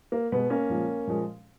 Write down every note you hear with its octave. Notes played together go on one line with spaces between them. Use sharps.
A#3
B2 G#3 B3
A#3 C#4
A#2 F3 G#3
A#2 F3 G#3